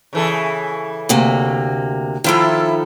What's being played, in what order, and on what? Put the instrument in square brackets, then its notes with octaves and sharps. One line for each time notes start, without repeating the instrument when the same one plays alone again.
[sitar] C#3 E3 A4
[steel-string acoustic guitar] D2 C3 A#3
[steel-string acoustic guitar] D#3 F3 A4 [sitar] E4 F4